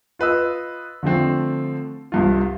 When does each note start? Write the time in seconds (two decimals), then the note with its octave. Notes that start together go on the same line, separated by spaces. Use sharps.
0.19 F4 B4 D#5 E6
1.03 D3 F3 A3 C4
2.12 C2 G2 F4